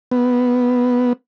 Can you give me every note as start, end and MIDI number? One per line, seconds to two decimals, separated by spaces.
0.11 1.13 59